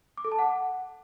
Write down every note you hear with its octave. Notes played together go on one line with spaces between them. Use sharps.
D6
A4
A5
F#5